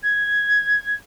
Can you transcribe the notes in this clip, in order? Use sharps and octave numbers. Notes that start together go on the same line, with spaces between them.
G#6